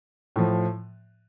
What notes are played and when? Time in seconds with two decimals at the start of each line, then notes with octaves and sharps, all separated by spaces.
0.36 A2 F3